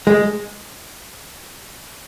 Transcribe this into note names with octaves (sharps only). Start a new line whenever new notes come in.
G#3